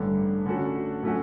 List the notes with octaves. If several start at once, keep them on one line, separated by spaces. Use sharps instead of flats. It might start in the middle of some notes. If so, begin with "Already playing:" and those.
Already playing: A1 G2 D3
D3 A3 C#4 F#4 A4
A2 F#3 A3 C#4 F#4